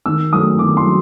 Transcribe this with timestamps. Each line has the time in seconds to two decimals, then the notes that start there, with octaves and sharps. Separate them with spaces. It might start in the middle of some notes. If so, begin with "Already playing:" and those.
0.06 D#3 E6
0.33 F#3 A3 D#6
0.59 D#3 D6
0.77 C6
0.86 F#3